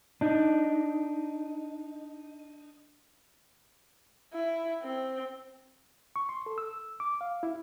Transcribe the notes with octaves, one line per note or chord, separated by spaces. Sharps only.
D4 D#4
E4
C4
C#6
C6
A4
E6
D6
F5
E4